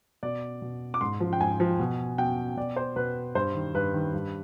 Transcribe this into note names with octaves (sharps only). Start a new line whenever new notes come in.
B2 D5
B2
D6
G#2 C6
F3
G5
G#2 G#5
F3
B2
B2 G5
B2 D5
C5
B2 B4
G2 C5
D#3
G2 B4
D#3
G2